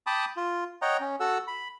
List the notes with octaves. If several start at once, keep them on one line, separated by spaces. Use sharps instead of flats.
G5 A5 B5 D6 D#6
F4
C#5 D#5 F#5 G5 A#5
C#4
F#4 A4 F#5 E6
B5